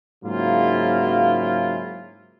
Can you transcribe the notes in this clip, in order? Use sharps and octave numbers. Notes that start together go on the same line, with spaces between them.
G#2 C#3 F#3 A#3 E4 F4